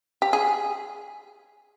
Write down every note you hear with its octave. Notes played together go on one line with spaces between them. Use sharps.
G4
G#4